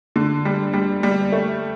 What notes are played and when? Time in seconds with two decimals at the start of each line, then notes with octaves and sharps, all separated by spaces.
0.16 D3
0.45 G3
0.73 G3
1.03 G3
1.32 A3